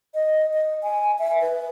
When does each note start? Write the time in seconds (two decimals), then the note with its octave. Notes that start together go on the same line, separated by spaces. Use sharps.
0.14 D#5
0.53 D#5
0.83 G#5
1.19 E5
1.41 B4